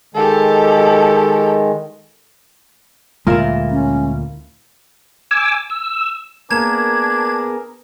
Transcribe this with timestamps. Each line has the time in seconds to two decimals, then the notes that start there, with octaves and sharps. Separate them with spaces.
0.15 D#3 G#3 G4 A4
3.27 D2 A#2 G#3 E4 F4 A#4 E5
3.71 C#4
5.31 G#5 D6 E6
5.70 E6
6.50 A#3 B3 D4 G#4 A#4 G#6 E7